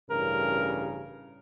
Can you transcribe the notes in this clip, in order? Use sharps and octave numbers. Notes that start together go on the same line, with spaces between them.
A1 G2 C#3 A#4